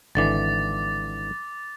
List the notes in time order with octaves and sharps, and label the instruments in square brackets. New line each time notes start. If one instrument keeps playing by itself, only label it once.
[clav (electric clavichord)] G#1 D3 E3 [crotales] D6 A6